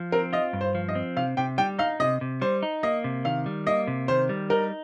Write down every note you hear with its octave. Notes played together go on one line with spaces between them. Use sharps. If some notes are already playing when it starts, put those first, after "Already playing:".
Already playing: F3
C4 A#4
F4 D#5
G2
C5
F3
D#5
C4
C3 F5
C3 G5
G3 G5
D#4 F5
C3 D#5
C3
G3 C5
D#4
A#3 D#5
C3
D#3 F5
G3
A#3 D#5
C3
D#3 C5
G3
D#4 A#4